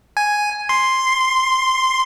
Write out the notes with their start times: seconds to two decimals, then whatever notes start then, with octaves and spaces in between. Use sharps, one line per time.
0.17 G#5
0.69 C6